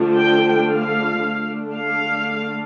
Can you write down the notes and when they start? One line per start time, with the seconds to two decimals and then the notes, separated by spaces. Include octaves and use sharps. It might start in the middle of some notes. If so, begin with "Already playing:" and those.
Already playing: D3 F3 A3 D4
0.17 G5
0.69 F5
1.21 D3 A3 D4
1.74 F5